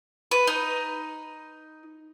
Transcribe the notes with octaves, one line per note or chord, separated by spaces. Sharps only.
B4
D#4